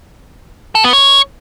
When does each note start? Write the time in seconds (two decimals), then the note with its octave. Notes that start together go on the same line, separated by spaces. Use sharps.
0.75 A4
0.84 B3
0.93 C#5